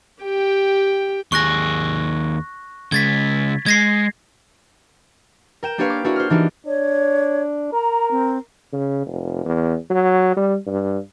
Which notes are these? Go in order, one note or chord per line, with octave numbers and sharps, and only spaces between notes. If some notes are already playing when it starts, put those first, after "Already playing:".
G4 G5
D#2 G#4 C#6 F#6 A#6
C#3 G#3 G#6 A6 B6
G#3 G#6 A#6 C7
A#4 G5 E7
A#3 D4 G4 B4 C#5 F5
D6
D4 E4 F#4 G#4 A#4 C#5
C5 F6
E3 D4 D#4 F#4 G4
D4 C#5
A#4 A#5
C4
C#3
F1
E2
F#3
G3
G2